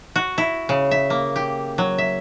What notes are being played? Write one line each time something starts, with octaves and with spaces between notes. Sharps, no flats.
F#4
E4
C#3
E5
A#3
G4
F#3
E5